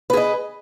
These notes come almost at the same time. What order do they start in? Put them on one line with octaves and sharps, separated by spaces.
B4 G#4 D#5